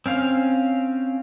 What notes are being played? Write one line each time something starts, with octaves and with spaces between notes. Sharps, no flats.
C4 C#4 F5